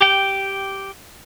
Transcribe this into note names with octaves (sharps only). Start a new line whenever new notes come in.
G4 G5